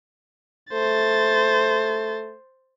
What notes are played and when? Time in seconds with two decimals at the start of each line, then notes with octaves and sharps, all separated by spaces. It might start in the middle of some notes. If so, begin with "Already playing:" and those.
0.73 A3 C5 A6